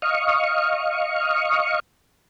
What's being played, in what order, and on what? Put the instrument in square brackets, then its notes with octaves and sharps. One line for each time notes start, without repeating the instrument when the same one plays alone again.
[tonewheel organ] D#5 F5 C#6